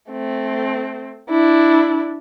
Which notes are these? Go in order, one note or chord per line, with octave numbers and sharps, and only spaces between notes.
A3 C4
D4 E4